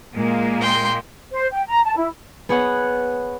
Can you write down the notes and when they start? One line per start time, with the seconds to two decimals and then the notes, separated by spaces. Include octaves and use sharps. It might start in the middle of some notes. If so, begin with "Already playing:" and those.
0.14 A#2 G#3 A#3
0.61 G5 C6
1.32 C5
1.53 G5
1.67 A#5
1.84 A5
1.96 E4
2.49 B3 G#4 C#5 F#5